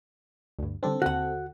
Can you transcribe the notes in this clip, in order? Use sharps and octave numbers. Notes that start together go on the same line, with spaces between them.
D2 G2
D3 G3 C4 D4 A4
D#2 D3 F#4 F#5